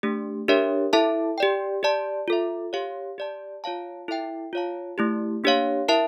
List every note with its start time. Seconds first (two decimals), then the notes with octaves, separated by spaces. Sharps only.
0.03 A3 D4 G4
0.48 D4 G4 A#4 C#5 E5
0.93 E4 A4 E5 A5
1.38 G4 D5 G5
1.83 G4 D5 A5
2.28 F4 A4 E5
2.73 G4 C#5 F5
3.18 G4 D5 A5
3.64 F4 C#5 F5 A5
4.08 E4 A4 E5 G5
4.53 F4 C#5 F5 A5
4.98 A3 E4 G4
5.44 A#3 D4 G4 C#5 F5
5.88 E4 A#4 E5 A5